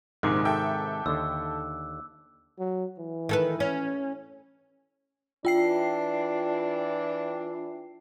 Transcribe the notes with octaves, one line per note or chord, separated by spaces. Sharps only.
A#1 G#2 C3 D#3 D6 F#6
A4 E5 G5
D#2 D3 E6
F#3
E3
D#3 A4 B4
C#4
E3 D4 F4 G5 C7